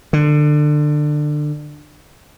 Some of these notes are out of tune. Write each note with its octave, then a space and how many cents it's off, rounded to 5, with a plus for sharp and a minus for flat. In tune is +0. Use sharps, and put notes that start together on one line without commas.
D3 +25